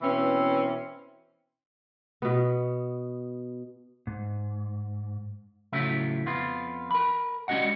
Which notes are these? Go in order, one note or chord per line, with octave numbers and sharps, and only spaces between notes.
B2 E3 C4 C#4
B2 B3
G#2
A2 C#3 F3 F#3 E5
F2 B3 F4
A#4 B5
G3 G#3 C#4 F#4 D#5 F#5